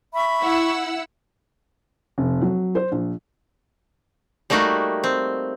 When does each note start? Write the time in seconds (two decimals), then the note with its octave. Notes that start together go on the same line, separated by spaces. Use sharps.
0.14 E5 B5 C#6
0.42 E4 F#5 E6
2.18 F1
2.41 F#3
2.75 C5
2.92 A#1
4.50 G3 A3 A#3 D#4 F#4
5.04 C4